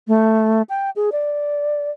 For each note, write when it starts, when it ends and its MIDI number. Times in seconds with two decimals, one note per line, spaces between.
0.08 0.62 57
0.69 0.90 79
0.96 1.10 68
1.12 1.90 74